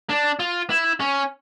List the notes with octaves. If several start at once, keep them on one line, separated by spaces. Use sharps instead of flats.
D4
F4
E4
C#4